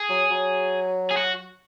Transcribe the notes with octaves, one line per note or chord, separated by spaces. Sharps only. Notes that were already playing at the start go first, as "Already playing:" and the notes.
Already playing: G#4
F#3
F#3
G#4
F#4